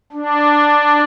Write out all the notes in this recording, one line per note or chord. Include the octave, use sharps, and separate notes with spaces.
D4